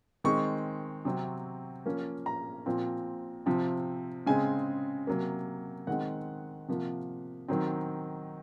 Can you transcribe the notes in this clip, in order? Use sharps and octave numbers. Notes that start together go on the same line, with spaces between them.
D#3 G#3 C4 C#6
C3 F#3 C4
F3 A#3 C#4
A#5
A#2 F3 C4
C3 F3 C4
C#3 G#3 C4 G#5
C3 F#3 A#3
D#3 G#3 C4 F#5
C3 F3 A#3
D#3 F#3 C4